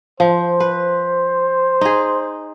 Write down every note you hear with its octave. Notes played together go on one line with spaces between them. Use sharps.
F3 C5
B4
D#4 G#4